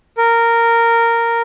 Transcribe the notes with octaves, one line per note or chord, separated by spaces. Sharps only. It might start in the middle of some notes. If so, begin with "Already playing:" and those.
A#4